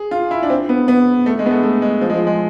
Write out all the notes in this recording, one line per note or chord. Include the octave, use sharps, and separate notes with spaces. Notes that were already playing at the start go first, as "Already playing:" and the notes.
Already playing: G#4
F4
E4
D4
C4
B3
B3
A3
G#3
B3
A3
A3
G#3
F3
G#3
F3
G#3